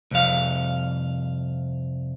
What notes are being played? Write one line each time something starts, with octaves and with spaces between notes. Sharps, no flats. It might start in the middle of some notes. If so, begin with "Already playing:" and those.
C2 F2 F5